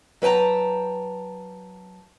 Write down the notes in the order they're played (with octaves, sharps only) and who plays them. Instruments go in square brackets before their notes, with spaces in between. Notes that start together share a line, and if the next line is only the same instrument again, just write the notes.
[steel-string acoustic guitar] F#3 B4 G5 A5 A#5